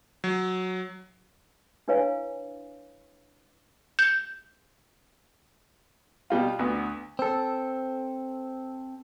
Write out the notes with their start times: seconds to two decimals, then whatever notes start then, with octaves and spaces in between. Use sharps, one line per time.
0.24 F#3
1.88 D4 E4 B4 C#5 F5 G#5
3.99 G6
6.30 B2 G3 F4
6.59 D2 B3
7.19 C4 A4